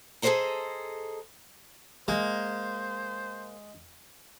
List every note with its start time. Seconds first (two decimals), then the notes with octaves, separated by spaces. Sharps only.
0.22 G#4 A4 B4 C5 D#5 A#5
2.08 G#3 A#3 C5